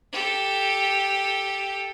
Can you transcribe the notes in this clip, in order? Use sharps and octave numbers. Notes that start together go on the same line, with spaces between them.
G4 A4